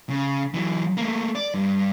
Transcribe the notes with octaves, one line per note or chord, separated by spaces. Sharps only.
C#3
E3 F#3
A3 A#3
D5
G2